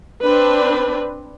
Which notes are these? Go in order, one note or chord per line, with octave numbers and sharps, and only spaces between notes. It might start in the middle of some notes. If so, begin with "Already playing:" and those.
C4 D4 B4